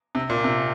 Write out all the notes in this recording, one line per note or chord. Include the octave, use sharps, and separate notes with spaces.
C3
A#2
C3